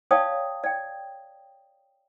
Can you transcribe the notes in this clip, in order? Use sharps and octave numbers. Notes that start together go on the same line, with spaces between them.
C#5 D5 F5 G5 A5 D#6
D5 G5